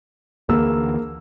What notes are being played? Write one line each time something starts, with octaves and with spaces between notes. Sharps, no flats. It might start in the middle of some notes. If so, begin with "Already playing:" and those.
D2 D3 E3 A#3 G#4 E6